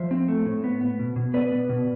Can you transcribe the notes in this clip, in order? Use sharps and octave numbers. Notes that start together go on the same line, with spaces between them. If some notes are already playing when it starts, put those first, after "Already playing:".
Already playing: F3 C5 E5
C4
A3
A2
B3
B3
B2
B2
B3 B4 D5
B3
B2